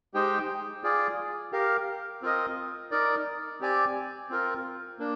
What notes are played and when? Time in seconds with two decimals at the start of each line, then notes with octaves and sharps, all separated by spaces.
0.14 G#3 D#4 G4 C5 G5
0.84 F4 G#4 D5
1.52 G4 A#4 F5
2.22 C4 F4 A#4 D#5
2.91 D#4 A#4 D5
3.61 C4 G4 D5 G#5
4.30 C4 F4 A#4
4.99 A#3 D4